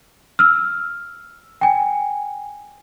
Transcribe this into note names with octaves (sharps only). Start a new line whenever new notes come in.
E6 F6
G5 G#5